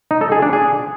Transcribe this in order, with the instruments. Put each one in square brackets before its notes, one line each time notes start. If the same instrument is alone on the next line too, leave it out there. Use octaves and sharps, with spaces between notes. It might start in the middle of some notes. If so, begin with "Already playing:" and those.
[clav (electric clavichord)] D#4
A4
G#4
D4
G#4